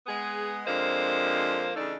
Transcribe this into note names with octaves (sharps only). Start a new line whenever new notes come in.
G#3 B3 G#4
F2 F3 G#3 A#3 D4 C5
C#3 E3 A3 D4 D#4